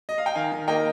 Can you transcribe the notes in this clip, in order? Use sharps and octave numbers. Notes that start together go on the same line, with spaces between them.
D#5
F5
G5
D#3 F5 G#5
D#3
A#3 D#5 G5